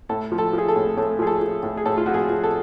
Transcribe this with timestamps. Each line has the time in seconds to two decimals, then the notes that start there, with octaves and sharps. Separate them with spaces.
0.09 A2 A4
0.32 F3
0.38 A4
0.53 F3 G#4
0.68 A4
0.76 A2
0.97 A2 A4
1.19 F3 G#4
1.27 A4
1.41 F3
1.63 A2
1.77 G#4
1.86 A2 A4
1.98 F4
2.06 F3 F#4
2.14 G#4
2.29 F3
2.44 A4